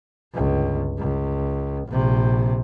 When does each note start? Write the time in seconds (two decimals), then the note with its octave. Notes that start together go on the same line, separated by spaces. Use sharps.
0.34 G1 C#2
0.98 C#2
1.88 A#1 C3